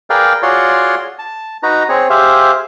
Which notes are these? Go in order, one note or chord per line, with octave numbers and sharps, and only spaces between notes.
G#4 A#4 B4 D5 F5 G5
F4 F#4 G#4 C#5 D5 C6
A5
D#4 F#4 B4 A#5
C4 G#4 C#5
G4 G#4 C5 E5 F5